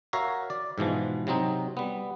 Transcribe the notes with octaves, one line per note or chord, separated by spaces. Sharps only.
F#4 A#4 C#5 E5 F5
D5
G#2 B2 E3 F3
C3 F#3 C4 D#4
G3 B3